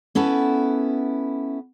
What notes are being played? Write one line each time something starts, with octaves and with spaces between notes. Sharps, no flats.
B3 C#4 E4 A4 B4